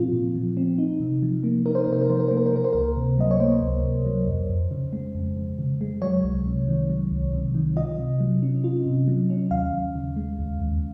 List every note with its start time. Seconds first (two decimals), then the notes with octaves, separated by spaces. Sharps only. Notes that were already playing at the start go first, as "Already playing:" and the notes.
Already playing: A#2 F3 C4 F4
0.13 A#2
0.35 F3
0.57 C4
0.78 D#4
1.00 C3
1.22 F3
1.44 A#3
1.66 D#4 A#4
1.75 C5
1.84 C3 A#4
1.93 C5
2.01 A#4
2.09 F3 C5
2.20 A#4
2.28 A#3 C5
2.37 A#4
2.46 C5
2.52 A#3 A#4
2.64 C5
2.73 C#2 A#4
2.97 C3
3.18 F#3 D#5
3.31 C#5
3.40 A#3 C5
3.62 C#2
3.84 C3
4.06 F#3
4.27 F2
4.50 F2
4.71 C#3
4.93 G#3
5.15 F2
5.37 F2
5.59 C#3
5.81 G#3
6.02 F#3 C#5
6.24 C2
6.46 C3
6.68 D#3
6.90 F#3
7.11 C2
7.33 C3
7.55 D#3
7.76 F4 D#5
7.99 C3
8.20 F#3
8.43 C#4
8.64 F4
8.86 C3
9.08 F#3
9.30 C#4
9.51 D#2 F5
9.73 D#2
9.95 C#3
10.16 G#3
10.39 D#2
10.61 D#2